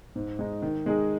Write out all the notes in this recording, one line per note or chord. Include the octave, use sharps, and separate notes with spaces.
G#2
G#3 D#4
D#3
G#3 D#4 G#4